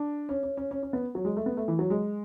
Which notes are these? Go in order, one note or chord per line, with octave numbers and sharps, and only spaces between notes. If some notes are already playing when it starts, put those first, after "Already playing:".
Already playing: D4
C#4
C#4
C#4
C#4
C#4
B3
F#3
G#3
A3
B3
A3
E3
F#3
G#3